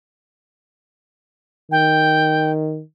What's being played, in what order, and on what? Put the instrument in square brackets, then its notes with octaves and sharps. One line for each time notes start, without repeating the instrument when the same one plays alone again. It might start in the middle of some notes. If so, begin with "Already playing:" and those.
[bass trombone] D#3 [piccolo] G5